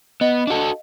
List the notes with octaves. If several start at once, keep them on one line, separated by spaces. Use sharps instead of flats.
B3 D#5
D4 F#4 A4 F5